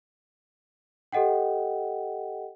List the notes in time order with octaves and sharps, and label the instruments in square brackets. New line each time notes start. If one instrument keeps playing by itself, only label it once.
[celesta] G4 A4 D#5 F#5 G5